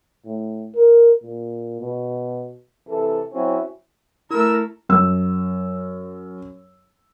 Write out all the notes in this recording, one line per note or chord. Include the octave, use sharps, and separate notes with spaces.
A2
A#4
A#2
B2
C3 E3 A4
F#3 C4 C#4 E4 F#4
A3 E4 A#4 E6
F#2 E6